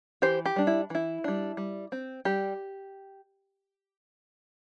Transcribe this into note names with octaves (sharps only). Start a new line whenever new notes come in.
E3 G4 C5
G4
G3 D4
E4
E3 E4
G3 D4
G3
C4
G3 G4